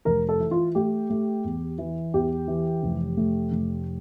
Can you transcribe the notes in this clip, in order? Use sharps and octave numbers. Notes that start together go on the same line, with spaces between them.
F1 A#4
A4
E3
F4
A3 G4
A3
E2
E3
E2 G4
E3
F1
A3
F1